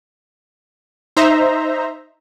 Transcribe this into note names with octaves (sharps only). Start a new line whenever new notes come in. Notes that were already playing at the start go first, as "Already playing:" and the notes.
D#4 C5 E5 A#5